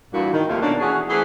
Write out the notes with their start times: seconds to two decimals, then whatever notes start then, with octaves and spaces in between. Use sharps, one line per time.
0.13 G2 A#2 E3 A#3 E4 F#4
0.33 D#3
0.48 D#2 C3 F3 A3 A#3 F4
0.61 B2 A#3 C#4 D4
0.80 E3 C#4 F#4 G#4
1.09 E3 A3 C4 G#4